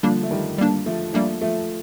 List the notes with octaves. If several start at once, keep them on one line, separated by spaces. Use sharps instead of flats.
D3 F3 G3 A#3 D4
A3
D#3 G3
G3 A#3 D4
F3 A3
F3 G3 A3 A#3 D4
F3 A3